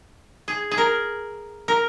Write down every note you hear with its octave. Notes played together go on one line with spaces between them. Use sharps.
G#4
G#4
A#4
A#4